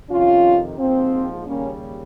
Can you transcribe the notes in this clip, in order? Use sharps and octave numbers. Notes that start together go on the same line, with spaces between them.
F2 C3 D#3 C#4 F4
A#1 G#2 F3 C4
D#2 C#3 G3 A#3 C#4